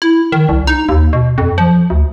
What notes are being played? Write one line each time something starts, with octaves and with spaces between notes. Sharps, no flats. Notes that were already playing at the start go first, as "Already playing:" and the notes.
E4
D#3
C2
D#4
D#2
B2
F2
F3
D2